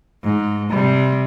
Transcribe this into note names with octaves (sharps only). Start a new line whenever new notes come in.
G#2
C3 G3